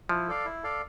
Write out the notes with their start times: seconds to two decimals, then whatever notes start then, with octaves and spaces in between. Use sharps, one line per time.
0.09 F3 E4
0.28 A4 D5 F5
0.46 E4
0.63 A4 D5 F5